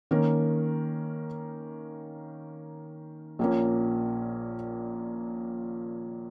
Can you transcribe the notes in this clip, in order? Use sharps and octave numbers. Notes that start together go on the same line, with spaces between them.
D#3 A#3 C#4 A#4
A#1 A#2 A#3 C#4